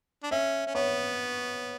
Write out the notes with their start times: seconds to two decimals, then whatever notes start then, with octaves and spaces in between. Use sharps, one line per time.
0.23 D4
0.31 C#4 E5
0.67 C#4
0.74 B3 C#5